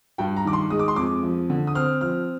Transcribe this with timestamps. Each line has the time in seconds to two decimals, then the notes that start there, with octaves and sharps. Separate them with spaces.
0.18 G2 G5
0.36 A#5
0.45 D#3 D6
0.53 C6
0.70 G#3 D#6
0.79 D6
0.88 C6
0.96 F2 D6
1.23 F3
1.50 D3
1.67 D#6
1.75 C4 F6
2.01 F3 F6